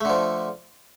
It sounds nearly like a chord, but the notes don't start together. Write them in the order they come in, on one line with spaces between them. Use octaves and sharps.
A3 D3 F3